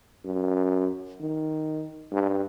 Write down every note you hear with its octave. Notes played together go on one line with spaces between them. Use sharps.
F#2
D#3
G2